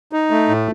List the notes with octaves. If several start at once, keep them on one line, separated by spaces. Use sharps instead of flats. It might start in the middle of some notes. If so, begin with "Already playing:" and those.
D#4
A3
A2